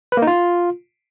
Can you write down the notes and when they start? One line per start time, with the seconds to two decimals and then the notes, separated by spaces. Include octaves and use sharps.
0.12 B4
0.17 A#3
0.22 D#4
0.27 F4